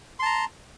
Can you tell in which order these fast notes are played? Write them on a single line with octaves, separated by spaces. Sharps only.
C6 A5 A#5